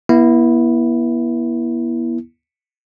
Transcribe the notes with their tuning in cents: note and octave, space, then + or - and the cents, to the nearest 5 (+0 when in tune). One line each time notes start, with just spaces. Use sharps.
B3 -40 E4 +0